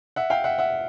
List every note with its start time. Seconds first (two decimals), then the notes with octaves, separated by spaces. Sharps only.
0.16 E5 F#5
0.30 F5 G5
0.44 E5 F#5
0.58 E5 F#5